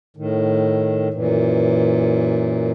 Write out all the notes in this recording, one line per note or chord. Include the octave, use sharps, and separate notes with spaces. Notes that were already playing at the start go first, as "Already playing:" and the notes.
A2 D#3
F#2 A#2 E3